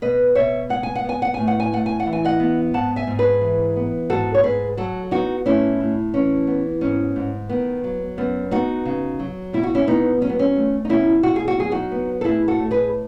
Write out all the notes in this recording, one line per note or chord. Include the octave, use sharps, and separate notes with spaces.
B2 B4 D#5
B2 C#5 E5
G#3 F#5
G#5
F#5
B3 G#5
F#5
A2 G#5
F#5
G#5
A2 F#5
G#5
F#5
E3
G#5
D#5 F#5
B3
G#2 F#5 A5
E5 G#5
G#2
G#4 B4
E3
B3
G#2 F#4 A4
C#5
G#2 G#4 B4
F#3 F#4 A4
B3 D#4 F#4
A2 C#4 E4
A2
E3 C#4
B3
G#2 C#4
G#2
D#3 B3
F#3
F#2 B3
B3 D#4 F#4
C#3
F#3
B2 E4
F#4
C#4 E4
B2 B3 D#4
F#3 C#4
B3
C#4
A3
D#4
B2 C#4 E4
B2 F#4
G#4
F#4
F#3 G#4
D#4 F#4
B3
A4
A2 E4 G#4
F#4 A4
A2
G#4 B4